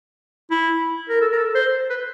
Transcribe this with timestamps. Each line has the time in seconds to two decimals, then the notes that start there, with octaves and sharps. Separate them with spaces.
0.51 E4
1.09 A#4
1.21 A4
1.32 A#4
1.37 A4
1.55 C5
1.90 B4